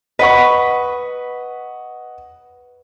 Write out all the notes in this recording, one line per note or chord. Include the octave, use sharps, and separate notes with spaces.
B4 D#5 F#5 C#6